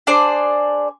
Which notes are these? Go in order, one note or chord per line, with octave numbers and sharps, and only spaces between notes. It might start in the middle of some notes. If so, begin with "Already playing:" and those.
D4 G#4 C5 D5